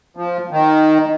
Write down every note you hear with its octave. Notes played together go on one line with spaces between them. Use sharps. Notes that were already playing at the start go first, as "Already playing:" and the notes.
F3
D#3